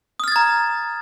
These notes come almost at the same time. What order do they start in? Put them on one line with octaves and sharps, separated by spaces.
D#6 F6 A6 G#6 A#5